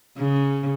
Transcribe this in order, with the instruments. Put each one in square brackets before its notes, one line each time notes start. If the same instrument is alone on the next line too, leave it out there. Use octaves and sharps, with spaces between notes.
[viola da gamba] C#3